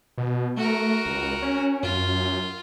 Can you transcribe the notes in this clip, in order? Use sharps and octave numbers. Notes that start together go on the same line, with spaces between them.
B2
A3 F#4 A#4
C#2
C#4
F#2 F4